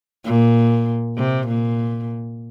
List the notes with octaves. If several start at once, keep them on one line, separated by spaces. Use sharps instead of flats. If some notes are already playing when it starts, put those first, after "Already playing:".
A#2
C3
A#2